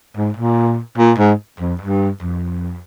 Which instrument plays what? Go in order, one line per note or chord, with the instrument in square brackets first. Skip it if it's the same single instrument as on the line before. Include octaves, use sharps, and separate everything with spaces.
[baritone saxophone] G#2
A#2
A#2
G#2
F2
G2
F2